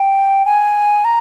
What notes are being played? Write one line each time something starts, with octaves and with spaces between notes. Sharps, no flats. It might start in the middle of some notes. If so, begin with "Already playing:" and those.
Already playing: G5
G#5
A#5